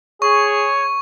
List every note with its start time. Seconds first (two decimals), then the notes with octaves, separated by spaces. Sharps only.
0.22 G#4 C#5 C#6